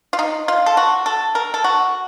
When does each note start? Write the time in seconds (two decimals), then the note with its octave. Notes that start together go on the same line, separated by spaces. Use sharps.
0.13 F4
0.19 D#4
0.48 F4
0.66 A4
0.77 F#4
1.06 A4
1.35 A#4
1.54 A4
1.64 F#4